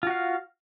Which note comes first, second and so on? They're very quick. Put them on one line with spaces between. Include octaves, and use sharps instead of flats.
F4 F#4 F5